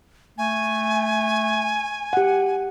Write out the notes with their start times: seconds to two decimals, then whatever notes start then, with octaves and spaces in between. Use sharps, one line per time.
0.38 A3 G#5
2.13 G4 F#5